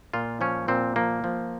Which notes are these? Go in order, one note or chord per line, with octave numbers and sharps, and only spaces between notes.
A#2 F4
F3 C#4
A#2 C4
F3 A#3
F3